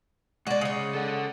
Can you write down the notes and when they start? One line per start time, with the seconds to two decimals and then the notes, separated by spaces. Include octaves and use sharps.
0.47 G#3 F#4 G#4 D5
0.61 C#3 C#5
0.94 A4 F#5